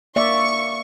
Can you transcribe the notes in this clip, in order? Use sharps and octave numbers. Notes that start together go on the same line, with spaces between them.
A#3 D5 E5 C#6